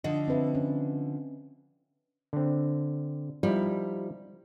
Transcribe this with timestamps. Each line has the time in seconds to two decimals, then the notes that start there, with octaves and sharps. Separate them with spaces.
0.04 D3 F3 D#5
0.28 C4 B4 E5
0.55 C#4
2.33 D3 C4
3.43 F3 G3 D#4 E4